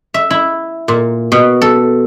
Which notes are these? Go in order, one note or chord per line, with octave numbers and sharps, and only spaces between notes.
E5
E4
A#2
B2
A4